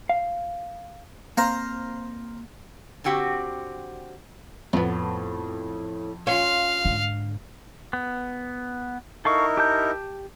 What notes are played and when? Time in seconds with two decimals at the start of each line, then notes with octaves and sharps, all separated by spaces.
0.09 F5
1.37 A#3 C4 C5 F5 A#5
3.04 D3 C4 F#4 G4
4.73 F2 A2 B3
6.27 C#4 F4 F5
6.85 G#2 D3
7.93 B3
9.25 D#4 E4 A4 A#4 F5 C#6
9.57 G4 A5 G6